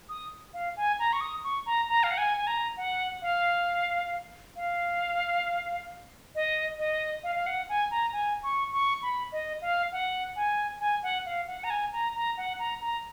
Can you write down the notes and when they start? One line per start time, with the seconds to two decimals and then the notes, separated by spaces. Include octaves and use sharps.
0.09 D#6
0.54 F5
0.77 G#5
0.99 A#5
1.13 C#6
1.21 D#6
1.44 C#6
1.66 A#5
1.89 A#5
2.03 F5
2.11 F#5
2.18 G#5
2.37 G#5
2.47 A#5
2.77 F#5
3.22 F5
4.56 F5
6.35 D#5
6.79 D#5
7.24 F5
7.36 F5
7.46 F#5
7.69 G#5
7.91 A#5
8.13 G#5
8.43 C#6
8.73 C#6
9.03 B5
9.32 D#5
9.62 F5
9.92 F#5
10.36 G#5
10.80 G#5
11.03 F#5
11.26 F5
11.47 F#5
11.64 A#5
11.70 G#5
11.93 A#5
12.15 A#5
12.37 F#5
12.59 A#5
12.81 A#5